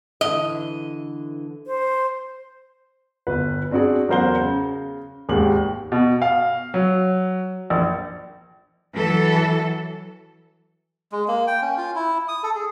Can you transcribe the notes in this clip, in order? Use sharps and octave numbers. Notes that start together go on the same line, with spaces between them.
D3 E3 D#5
C5
G1 B4
C4 D4 F#4 G#4 D5
E2 F#3 A#4 C5 F#5 G7
C#3
G#1 D#2 G#3 G4 F#7
B2
F5
F#3
A#1
E3 F#3 A4
G#3
A#3
G5
C#4
F4
E4
D#6
A4
G#4